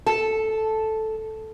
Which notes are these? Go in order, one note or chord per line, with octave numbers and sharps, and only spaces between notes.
A4